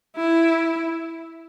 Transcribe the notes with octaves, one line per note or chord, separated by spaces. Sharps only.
E4